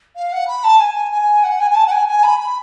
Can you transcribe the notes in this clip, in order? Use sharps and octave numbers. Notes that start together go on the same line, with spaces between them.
F5
F#5
B5
A5
G#5
G#5
F#5
G#5
G#5
A5
F#5
G#5
G#5
B5
B5